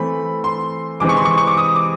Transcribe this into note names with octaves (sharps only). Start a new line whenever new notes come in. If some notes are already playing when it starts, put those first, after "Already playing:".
Already playing: E3 A3 C4 B5
C6
C3 E3 G#3 C4 D6
C#6
C6
C#6
C#6
D6
D#6
D6